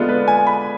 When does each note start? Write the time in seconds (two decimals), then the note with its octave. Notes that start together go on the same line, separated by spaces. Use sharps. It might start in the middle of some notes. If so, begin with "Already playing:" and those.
Already playing: D3 G#3 B3 D4 F4
0.09 B4
0.28 G#5
0.47 B5